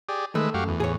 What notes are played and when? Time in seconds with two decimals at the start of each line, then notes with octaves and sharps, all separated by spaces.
0.09 G4 G#4 D5
0.35 D#3 G#3 A3 B4 E5
0.54 F#2 F#4 G4 F5
0.68 E2
0.80 A2 G#4 C#5